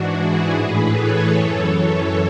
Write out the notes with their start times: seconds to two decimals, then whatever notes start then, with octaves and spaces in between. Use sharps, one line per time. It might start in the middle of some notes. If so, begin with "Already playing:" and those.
Already playing: G#2 E3 D4 F#4
0.12 E4 G#4
0.51 A2 E3 G#4 B4
0.91 A4 C#5
1.30 F#2 E3 A4 C#5
1.71 A4 C#5